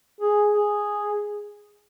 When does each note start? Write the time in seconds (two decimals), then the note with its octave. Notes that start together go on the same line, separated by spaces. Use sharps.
0.20 G#4
0.52 G#4